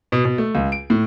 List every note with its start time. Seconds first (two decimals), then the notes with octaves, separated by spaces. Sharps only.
0.12 B2
0.25 B2
0.38 A3
0.55 C#2
0.72 D7
0.90 A2